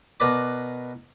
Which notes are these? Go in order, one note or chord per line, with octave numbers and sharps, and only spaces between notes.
B2 A#4 B4 D5 B5 D6